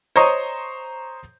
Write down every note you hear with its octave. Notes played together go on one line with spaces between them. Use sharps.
C5 C#5 D#5 A#5 C#6 D#6